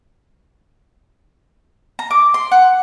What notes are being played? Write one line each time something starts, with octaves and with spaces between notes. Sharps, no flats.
A#5
D6
C6
F#5